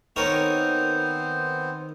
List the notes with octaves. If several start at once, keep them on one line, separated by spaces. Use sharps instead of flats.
D#3 B3 C4 A#4 C5 C#5